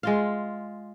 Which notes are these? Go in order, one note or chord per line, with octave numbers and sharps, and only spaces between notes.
G#3 F4 F5